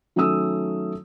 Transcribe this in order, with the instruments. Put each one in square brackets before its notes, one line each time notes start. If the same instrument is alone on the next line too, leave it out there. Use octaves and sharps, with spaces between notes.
[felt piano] D#3 F#3 A3 C#4 D#6 E6